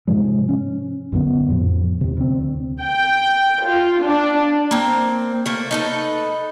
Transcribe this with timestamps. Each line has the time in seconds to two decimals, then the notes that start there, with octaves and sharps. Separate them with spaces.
0.07 G#2 C3 F3 G#3
0.49 C#4
1.12 B1 F#2 D3 B3
1.50 F2 A2 F3
2.01 D#2 C3
2.17 D2 C4
2.80 G5
3.67 F4
4.03 D4
4.71 A#3 C4
5.46 A3 A#3
5.71 D#4 A4 B4